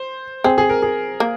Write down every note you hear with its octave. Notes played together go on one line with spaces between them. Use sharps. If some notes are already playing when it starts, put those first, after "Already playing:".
Already playing: C5
C4 G#4
G#4
A#4
G#4
A#3